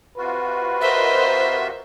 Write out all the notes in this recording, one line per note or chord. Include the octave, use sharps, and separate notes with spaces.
C3 F4 F#4 B4
A#4 C5 D#5 E5